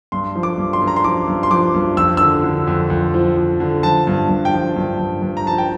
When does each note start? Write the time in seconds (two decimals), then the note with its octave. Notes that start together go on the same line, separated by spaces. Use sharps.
0.12 G2 C6
0.36 F3
0.43 D6
0.58 G2
0.73 C6
0.82 G2
0.87 A#5
0.96 C6
1.04 F3 D6
1.28 G2
1.43 C6
1.51 F3 D6
1.74 G2
1.97 F2 E6
2.17 D3 E6
2.44 D3
2.67 F2
2.90 F2
3.14 F3
3.37 F2
3.60 D3
3.83 F3 A5
4.07 G2
4.29 G2
4.45 G5
4.54 F3
4.76 G2
4.99 G2
5.22 G2
5.37 A#5
5.46 F3 A5
5.58 G5